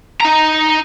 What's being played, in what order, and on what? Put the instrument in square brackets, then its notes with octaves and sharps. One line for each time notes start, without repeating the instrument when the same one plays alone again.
[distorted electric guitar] D#4 A#5